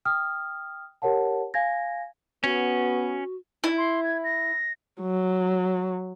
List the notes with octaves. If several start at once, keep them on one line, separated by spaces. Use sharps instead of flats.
G5 D#6 F6
G4 A#4 C#5 F#5 A5
F5 G#5 G#6 A#6
B3 C#4 F#4
E4
C6
G#6
A#6
F#3